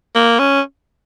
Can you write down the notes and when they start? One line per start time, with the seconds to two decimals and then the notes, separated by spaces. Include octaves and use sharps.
0.15 A#3
0.39 C#4